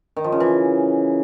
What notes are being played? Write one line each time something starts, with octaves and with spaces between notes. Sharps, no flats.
D#3
F3
C#3
E3